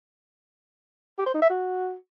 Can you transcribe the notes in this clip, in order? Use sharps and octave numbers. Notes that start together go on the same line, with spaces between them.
G4
C5
D#4
E5
F#4